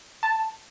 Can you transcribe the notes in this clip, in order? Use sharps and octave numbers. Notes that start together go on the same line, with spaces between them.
A5